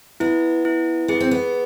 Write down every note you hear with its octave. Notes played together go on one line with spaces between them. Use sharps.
B3 E4
E4
B3 G#4
C4
B3